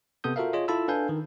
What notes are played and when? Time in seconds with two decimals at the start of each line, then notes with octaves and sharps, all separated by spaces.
0.24 C3 B3 A4 D#6 G6
0.36 F4 F#4 A4 A#4 E5 F5
0.53 F4 G#4 C#5 D#5
0.68 E4 F4 A4 A5 B5 E6
0.88 D4 A4 B4 F5 G#5 G6
1.09 D#3